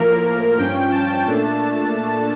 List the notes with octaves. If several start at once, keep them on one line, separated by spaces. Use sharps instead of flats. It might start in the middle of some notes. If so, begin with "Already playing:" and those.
Already playing: A2 F3 A#3 A#4
G2 F3 C#4 G5
A5
A#2 A3 D4